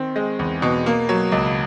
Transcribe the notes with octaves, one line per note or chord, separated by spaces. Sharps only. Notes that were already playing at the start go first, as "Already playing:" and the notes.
Already playing: D#3 C4
G#3
E2
B2
A#3
F#3
C#2